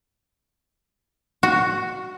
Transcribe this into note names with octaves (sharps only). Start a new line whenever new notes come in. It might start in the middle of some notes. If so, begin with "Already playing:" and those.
F#4